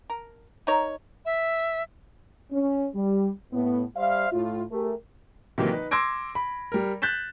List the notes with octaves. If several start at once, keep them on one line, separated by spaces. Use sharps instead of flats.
A#4
D#4 A#4 C#5
E5
C#4
G3
A2 B3
G3 C5 D5 E5 F5
A2 F4
A3 G4 G#4 A#4
C3 D#3 E3 F#3 A#3
D#4 B4
C6 D6 E6 G#6 A#6 D7
B5
G3 A#4
F#6 G6 A6 B6 E7